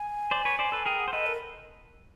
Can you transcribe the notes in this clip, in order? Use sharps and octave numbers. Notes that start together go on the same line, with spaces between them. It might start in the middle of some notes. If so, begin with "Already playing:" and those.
Already playing: G#5
C5 D5
B4 C#5
C5 D5
A4 B4
G#4 A#4 G5
F#5
C5
A4 B4 D#5
A#4